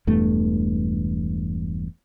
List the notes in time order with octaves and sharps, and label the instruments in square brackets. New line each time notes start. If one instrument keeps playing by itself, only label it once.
[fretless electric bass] E1 E2 G2 A3